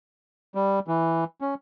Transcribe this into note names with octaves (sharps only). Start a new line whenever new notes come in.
G3
E3
C#4